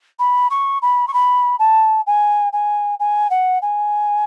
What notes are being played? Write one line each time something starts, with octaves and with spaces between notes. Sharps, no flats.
B5
C#6
B5
C#6
B5
A5
G#5
G#5
G#5
F#5
G#5